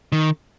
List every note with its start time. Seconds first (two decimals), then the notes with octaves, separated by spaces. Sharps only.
0.12 D#3